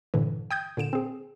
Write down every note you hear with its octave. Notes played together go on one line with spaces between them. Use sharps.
G2 A#2 D3 E3
G5 D#6 G6 G#6
A#2 D3 D7 E7
C4 G#4